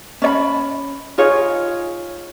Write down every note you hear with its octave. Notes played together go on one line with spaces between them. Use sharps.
C#4 D5 B5
D#4 F4 G#4 C#5